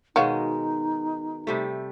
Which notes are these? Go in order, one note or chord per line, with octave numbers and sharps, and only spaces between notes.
B2 D#3 G#3 D#4 F#4 C#5 F5
C3 G3 A3